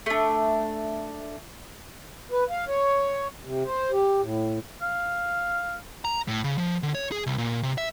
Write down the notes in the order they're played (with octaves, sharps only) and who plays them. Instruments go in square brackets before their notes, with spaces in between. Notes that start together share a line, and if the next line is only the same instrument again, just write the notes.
[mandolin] A3 D4
[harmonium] B4
F5
C#5
C3
C5
G4
A2
[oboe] F5
[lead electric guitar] A#5
A2
C#3
F3
D3
C#5
G#4
C2
A#2
C3
E5